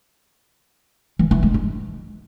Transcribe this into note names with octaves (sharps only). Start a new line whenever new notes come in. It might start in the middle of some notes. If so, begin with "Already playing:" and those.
E3
E3
G#3
D#4